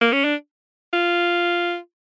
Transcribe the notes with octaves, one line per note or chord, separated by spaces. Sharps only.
A#3
C#4
D4
F4